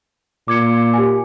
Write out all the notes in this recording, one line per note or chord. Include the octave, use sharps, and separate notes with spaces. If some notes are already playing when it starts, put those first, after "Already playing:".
A#2 D6 G#6 C#7
G4 G#5